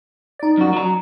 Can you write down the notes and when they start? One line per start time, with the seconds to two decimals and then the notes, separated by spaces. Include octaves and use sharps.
0.39 D#4 D5
0.58 F#2 F#4
0.73 F#3 A#5